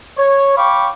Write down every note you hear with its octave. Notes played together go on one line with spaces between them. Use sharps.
C#5
F5 G5 B5 C#6 D6